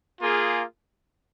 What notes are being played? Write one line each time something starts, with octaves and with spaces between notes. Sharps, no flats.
A#3 F4 G#4